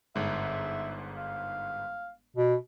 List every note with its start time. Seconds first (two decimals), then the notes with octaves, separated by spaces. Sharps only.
0.16 G1 G#2 E5
1.17 F5
2.36 B2